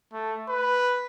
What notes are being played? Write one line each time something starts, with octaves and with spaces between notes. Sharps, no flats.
A3
B4